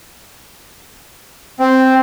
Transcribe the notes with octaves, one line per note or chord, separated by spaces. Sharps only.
C4